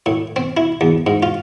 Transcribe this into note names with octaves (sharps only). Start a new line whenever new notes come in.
A2
C4
E4
E2
G#2
F4